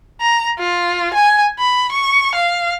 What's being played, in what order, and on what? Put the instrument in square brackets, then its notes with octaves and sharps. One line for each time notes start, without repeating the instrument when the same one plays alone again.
[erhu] A#5
F4
G#5
B5
C#6
F5